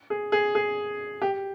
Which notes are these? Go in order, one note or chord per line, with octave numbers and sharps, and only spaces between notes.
G#4
G#4
G#4
G4